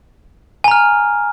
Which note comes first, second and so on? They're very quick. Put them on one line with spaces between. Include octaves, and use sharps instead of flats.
G#5 A#5 F6